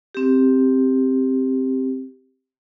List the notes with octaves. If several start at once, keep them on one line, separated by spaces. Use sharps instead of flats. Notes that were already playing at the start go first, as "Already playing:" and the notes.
C4 G4